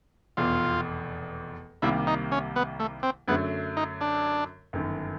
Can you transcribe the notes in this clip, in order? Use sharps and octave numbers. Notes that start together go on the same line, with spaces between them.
F1 E2 B2 F4
C2 C3 D#3 G3 A#3 E4
D#4
C#4
B3
A3
C4
F#2 D3 F#3 A3 B3
D#4
D4
G1 F#2 D#3